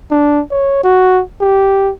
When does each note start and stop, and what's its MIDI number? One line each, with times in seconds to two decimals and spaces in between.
0.11 0.41 62
0.50 0.79 73
0.83 1.22 66
1.41 1.92 67